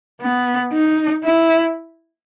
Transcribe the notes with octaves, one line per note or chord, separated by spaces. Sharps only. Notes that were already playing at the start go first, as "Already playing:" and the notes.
B3
D#4
E4